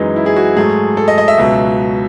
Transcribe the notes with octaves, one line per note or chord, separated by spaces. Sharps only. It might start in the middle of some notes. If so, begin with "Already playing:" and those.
Already playing: F#2 E3 G#3 D#4
E4
G#4
F#4
G#2 F#3 A3 G#4
A4
D#5
D#5
E5
C#2 B2 F#3